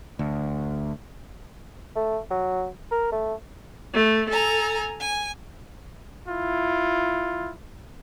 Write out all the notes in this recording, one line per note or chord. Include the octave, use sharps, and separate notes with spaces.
D2
A3
F#3
A#4
A3
A3
A4 G#5 A#5
G#5
E4 F4